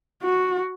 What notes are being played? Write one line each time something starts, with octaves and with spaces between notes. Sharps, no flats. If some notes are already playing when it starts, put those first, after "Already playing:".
F#4